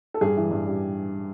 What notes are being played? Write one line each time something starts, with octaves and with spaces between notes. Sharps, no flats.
A4
G2 G#4
E3
G2
G3